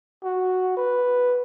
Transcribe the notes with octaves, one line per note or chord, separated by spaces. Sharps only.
F#4
B4